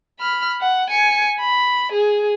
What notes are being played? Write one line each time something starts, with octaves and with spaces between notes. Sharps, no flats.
B5 F6
F#5
G#5 C#7
B5
G#4